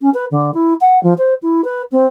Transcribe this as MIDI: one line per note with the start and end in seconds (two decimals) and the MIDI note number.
0.01 0.10 61
0.14 0.25 71
0.31 0.53 50
0.54 0.74 64
0.81 1.01 78
1.03 1.14 53
1.18 1.34 72
1.42 1.64 64
1.64 1.82 71
1.92 2.06 60